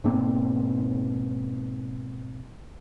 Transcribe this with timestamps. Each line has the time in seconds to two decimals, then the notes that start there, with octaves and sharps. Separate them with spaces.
0.04 G#2 B2 A#3 C4